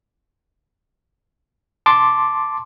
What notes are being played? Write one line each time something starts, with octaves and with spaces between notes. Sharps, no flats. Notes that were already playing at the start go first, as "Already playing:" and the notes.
A5 C6 D6